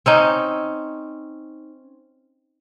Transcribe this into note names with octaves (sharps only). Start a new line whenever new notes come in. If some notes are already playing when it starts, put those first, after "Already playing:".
C4 C#4 D#4